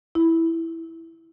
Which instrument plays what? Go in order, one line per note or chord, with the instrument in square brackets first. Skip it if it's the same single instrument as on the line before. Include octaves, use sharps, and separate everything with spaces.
[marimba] E4